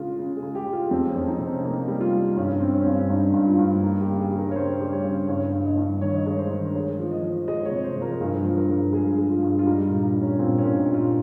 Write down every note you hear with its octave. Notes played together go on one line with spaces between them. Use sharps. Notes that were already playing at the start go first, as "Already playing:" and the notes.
Already playing: C#3 G#3 F4
C#3
G#4
G#3
G4
G#3
F4
F2 C4
C#4
F2
D#4
C3
C#4
A#3 D#4
G3
F4
G3
G2 C#4
C4
C#4
G2 C4
C#4
G2 D#4
G2
F4
G2
A#3 D#4
G4
C#3
G#4
G3
A#4
C#5
C#3 C5
G3
C#5
C#3
G2 C#5
G2
D#5
G2
D#3 C#5
D#5
G#3 C#5
C5
D#3
G#3 C#5
F3
D#5
F3
G#3 D#5
C#5
C3
C5
F3
A#4
G2 G#4
F3
A#4
G2
G#3 G#4
G#3
F4
G2
F4
G3 D#4
A#2
D#4
G3
C#4
A#2 C4
C#4
A#2
D#4
A#2
F4